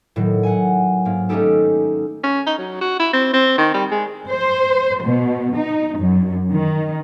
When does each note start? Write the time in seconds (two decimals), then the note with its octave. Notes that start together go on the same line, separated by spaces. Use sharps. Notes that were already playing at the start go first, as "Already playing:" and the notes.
0.16 A2 D#3 F#3
0.43 F#5 G#5
1.05 G#2 A#3
1.29 G#3 A3 C#4 D#4 G4 A4
2.23 C#4
2.46 D#4
2.58 F#3
2.81 F#4
2.99 E4
3.13 C4
3.33 C4
3.58 D#3
3.74 G3
3.91 G#3
4.28 C5
5.03 B2
5.56 D#4
5.98 F#2
6.52 D#3